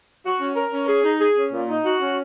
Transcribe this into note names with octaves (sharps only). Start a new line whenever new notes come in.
F#4
C#4
A#4
C#4
G#4
D#4
G#4
C#4
A#2
D#4
F#4
C#4